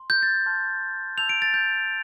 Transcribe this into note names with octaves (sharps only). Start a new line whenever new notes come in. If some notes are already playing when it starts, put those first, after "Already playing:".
Already playing: C6
G6
A6
A5 C6 F6
A5 E6 G6 F7
D7
A6
G6